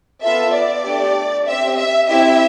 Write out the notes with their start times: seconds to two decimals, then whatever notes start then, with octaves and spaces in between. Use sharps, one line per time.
0.23 B3 F4 A4 E5
0.54 D5
0.85 A3 D4 G4
1.47 C4 G4 E5
1.77 E5
2.09 C4 E4 G4 E5